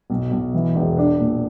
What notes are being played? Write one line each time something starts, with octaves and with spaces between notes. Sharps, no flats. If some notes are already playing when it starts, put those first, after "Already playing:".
B1
B1
E3
E1
D4
A#2